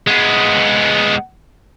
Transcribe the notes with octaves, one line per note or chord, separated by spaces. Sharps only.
G#3 B3